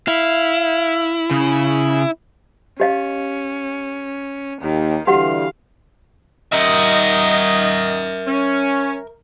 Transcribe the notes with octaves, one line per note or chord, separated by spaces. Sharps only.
E4 F5
C#3
C#4 G4 D#5 F5
D#2 D#3
D3 E3 G3 F#4 G4 F5 F#5
D#3 A#4 D#5 E5
C#4